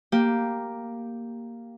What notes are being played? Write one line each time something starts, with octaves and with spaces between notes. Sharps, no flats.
A#3 G4